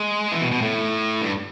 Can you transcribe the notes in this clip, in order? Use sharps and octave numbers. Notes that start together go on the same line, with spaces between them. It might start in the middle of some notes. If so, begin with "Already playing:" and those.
Already playing: G#3
E3
B2
B2
A2
G2